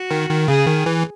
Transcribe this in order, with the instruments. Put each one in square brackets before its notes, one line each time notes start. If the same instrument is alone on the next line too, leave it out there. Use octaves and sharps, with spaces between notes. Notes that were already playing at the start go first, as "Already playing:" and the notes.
Already playing: [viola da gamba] F#4
[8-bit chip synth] D#3
D#3
[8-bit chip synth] C#3 [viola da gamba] G#4
[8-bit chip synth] D#3
E3